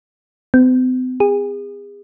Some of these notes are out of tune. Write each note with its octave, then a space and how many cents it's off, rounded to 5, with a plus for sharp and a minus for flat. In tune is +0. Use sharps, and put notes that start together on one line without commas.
C4 -45
G#4 -35